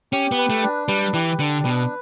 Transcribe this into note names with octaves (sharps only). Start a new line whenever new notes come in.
C#4 G4
B3
B4
A3
D4
G3 B4
E3 G4
D3 D4
B2 B4